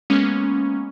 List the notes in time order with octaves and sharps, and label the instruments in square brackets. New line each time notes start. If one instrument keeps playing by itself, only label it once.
[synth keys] G#3 A#3 B3 C#4